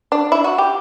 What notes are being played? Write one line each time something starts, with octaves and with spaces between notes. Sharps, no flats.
D4
E4
F#4
G4